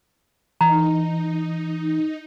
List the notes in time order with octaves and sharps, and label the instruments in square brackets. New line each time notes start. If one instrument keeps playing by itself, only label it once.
[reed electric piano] E3 [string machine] D#4 [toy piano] A#5